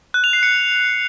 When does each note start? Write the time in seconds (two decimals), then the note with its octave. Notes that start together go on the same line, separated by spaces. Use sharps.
0.14 F#6
0.24 F7
0.33 C7
0.43 C#7